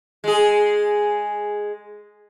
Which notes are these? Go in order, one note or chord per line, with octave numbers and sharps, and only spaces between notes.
G#3 G#4